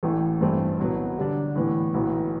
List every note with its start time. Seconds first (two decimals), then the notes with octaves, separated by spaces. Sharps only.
0.03 A1 A2 E3 A3
0.41 G2 E3 A3 C4
0.79 C2 B2 F#3 B3
1.18 D3 G3 D4
1.56 A2 E3 B3
1.94 B1 A2 E3 B3